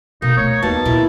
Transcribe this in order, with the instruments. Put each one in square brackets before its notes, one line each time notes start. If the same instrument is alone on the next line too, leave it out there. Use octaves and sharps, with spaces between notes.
[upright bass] B2 [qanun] A#3 [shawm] D#4
[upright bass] A3 [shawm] C#5
[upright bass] D#2 [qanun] B2 A#3 [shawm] A5
[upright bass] A#2 D3 [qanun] E4 F4 A#4